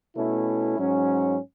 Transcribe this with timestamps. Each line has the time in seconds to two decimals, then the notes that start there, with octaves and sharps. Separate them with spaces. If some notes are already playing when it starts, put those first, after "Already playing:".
0.16 B2 A3 C#4 E4
0.77 G#2 F#3 C#4